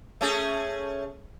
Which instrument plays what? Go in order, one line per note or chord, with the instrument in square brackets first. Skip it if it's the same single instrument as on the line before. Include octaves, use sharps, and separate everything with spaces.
[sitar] A3 C#4 G#4